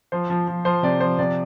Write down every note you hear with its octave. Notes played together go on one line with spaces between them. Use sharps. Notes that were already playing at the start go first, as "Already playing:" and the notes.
F3 C5
F3
F3
F3 C5
C3 D5
F3 C5
C3 D5